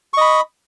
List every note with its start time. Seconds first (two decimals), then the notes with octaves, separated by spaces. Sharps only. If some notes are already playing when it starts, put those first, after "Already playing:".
0.14 C#6
0.17 D#5
0.21 B5